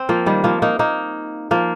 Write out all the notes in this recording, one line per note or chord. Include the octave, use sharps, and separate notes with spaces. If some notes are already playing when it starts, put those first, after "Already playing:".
Already playing: C4
F3 A#3
D#3 G3
F3 A#3
A#3 D#4
A#3 D#4
F3 A#3